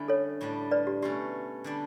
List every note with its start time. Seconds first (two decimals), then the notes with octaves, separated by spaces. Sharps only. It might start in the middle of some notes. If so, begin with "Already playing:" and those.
Already playing: D3 G3 A3 C#4 E4
0.08 A4 C#5
0.41 A2 G3 D4
0.71 B4 D5
0.87 G4
1.02 B2 A3 C#4 G4
1.64 D3 G3 D4